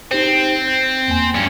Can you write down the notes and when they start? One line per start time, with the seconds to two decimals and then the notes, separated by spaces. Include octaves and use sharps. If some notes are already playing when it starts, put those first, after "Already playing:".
0.11 C4 D#4 G4 C5
0.68 G6
1.08 E2 A#3 G#5
1.34 G2 C#4